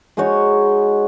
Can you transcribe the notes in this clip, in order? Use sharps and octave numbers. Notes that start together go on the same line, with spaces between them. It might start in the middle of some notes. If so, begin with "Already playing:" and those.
G#3 D#4 F#4 C#5